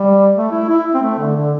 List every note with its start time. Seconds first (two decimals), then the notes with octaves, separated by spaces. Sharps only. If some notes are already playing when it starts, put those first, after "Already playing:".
Already playing: G3
0.35 A3
0.51 E4
0.68 E4
0.94 C4
1.02 A3
1.18 D3
1.35 D3